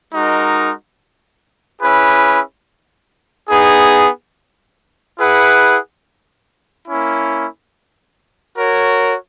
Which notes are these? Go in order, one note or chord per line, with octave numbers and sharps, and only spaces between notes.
G#3 D#4 F#4 A#4
C#4 E4 G#4 B4
B3 D#4 G#4
E4 G#4 B4 F#5
A#3 C#4 E4
F#4 A#4 C#5